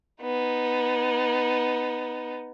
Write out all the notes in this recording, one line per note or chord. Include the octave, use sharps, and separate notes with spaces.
B3 D#4